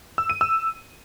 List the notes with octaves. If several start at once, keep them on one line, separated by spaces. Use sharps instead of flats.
E6
D#7
E6